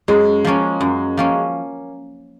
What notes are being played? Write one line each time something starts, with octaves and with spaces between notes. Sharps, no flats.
F#2 G#3
F3 A#3 C#4
F#2
F3 A#3 C#4